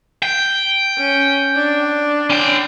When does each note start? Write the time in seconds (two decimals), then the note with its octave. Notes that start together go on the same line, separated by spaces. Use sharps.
0.22 G5
0.98 C#4
1.56 D4
2.30 C#4 G5